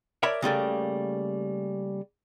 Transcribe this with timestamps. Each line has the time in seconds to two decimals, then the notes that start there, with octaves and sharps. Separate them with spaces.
0.23 A#4 C#5 D5 E5 A5 B5
0.42 C#3 G3 A3 A#3